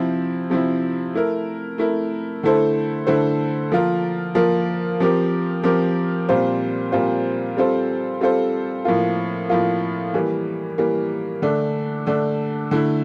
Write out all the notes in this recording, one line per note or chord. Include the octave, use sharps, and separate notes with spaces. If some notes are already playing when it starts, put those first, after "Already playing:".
Already playing: C3 F3 C4 E4
C3 F3 C4 E4
A3 E4 A#4
A3 E4 A#4
D3 A3 E4 A4 C5
D3 A3 E4 A4 C5
F3 A#3 F4 A#4
F3 A#3 F4 A#4
F3 C4 G4 A#4
F3 C4 G4 A#4
A#2 G3 C4 F4 C5
A#2 G3 C4 F4 C5
G3 C4 F4 A4 C5
G3 C4 F4 A4 C5
A2 F3 A#3 F4
A2 F3 A#3 F4
E3 G3 A#3
E3 G3 A#3
D3 A3 D4
D3 A3 D4
D3 A3 E4